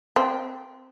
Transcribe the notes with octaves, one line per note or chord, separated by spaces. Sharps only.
C4